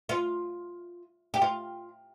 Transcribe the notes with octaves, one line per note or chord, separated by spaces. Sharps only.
F4
G4
F4